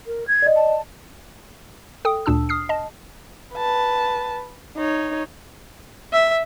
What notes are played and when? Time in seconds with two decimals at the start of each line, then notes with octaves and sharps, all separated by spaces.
0.06 A#4
0.27 G#6
0.42 D5 D#5
0.56 A5
2.05 A4 G5 D#6
2.26 D2 A#2 D4 A5 E6
2.49 D#6 F6 C7
2.69 D#5 A5
3.54 B4 A5
4.76 D#4 C#5
6.13 E5